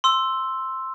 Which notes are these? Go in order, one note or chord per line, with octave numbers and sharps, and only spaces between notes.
C6 E6